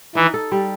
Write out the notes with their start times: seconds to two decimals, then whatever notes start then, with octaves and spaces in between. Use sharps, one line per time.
0.15 E3 D#4
0.34 A4
0.52 G3